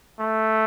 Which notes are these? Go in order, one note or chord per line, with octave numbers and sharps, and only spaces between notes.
A3